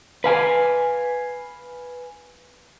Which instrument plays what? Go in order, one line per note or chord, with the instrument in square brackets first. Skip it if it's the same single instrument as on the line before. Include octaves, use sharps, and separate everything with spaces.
[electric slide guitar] B4 F5 G#5